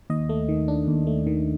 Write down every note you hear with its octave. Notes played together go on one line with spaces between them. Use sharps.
D#2 D#5
A3
D#3
D4
D#2
A3
D#3